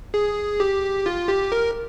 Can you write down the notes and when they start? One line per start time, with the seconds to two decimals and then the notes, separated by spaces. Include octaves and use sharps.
0.14 G#4
0.60 G4
1.06 F4
1.28 G4
1.52 A#4